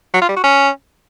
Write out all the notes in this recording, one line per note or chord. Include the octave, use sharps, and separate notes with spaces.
F#3
F4
G3
F#4
C#4